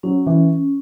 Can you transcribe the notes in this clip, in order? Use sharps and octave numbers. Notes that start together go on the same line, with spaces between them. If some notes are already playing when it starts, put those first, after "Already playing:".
F#3 C#4
E3